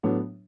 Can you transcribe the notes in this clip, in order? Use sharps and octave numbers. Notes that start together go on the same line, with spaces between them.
A2 F#3 B3 D4